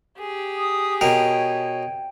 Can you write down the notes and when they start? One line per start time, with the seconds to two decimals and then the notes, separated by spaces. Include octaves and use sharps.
0.19 G4 G#4
0.57 D#6
1.01 B2 A#4 C#5 G5